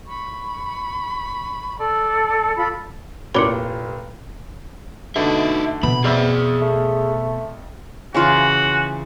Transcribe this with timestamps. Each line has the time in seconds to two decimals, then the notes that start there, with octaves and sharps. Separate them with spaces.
0.06 B5 C#6
1.77 A4 D5
2.56 F4 A4 D5 B5
3.34 F1 A#2 E4 A#4 C#5 D5 B5
5.16 B2 D3 A3 D#4 E5
5.83 B2 B3 B5
6.04 F2 G#4 D5 E5
6.62 A3
8.14 C#3 E3 F4 F#4